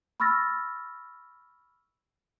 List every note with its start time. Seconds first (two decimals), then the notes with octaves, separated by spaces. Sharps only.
0.20 B5 C#6 E6 F6 A6 A#6